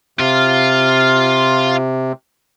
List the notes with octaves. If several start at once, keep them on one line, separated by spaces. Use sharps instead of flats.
C3 F4